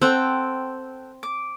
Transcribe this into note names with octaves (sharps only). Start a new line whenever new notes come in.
C4 A4 F#5 G5
D6